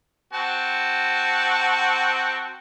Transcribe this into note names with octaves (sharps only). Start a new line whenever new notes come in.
C4 F#4 A5